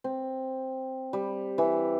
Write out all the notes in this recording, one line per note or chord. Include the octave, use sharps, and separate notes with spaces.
C4
G3
E3